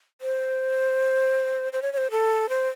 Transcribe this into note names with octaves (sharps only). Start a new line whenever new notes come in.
C5
C5
C#5
C#5
C5
A4
C5